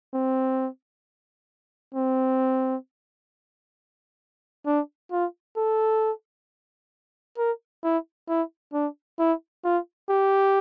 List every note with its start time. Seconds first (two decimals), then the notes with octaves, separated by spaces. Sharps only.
0.14 C4
1.95 C4
4.66 D4
5.12 F4
5.57 A4
7.38 A#4
7.84 E4
8.29 E4
8.73 D4
9.19 E4
9.65 F4
10.09 G4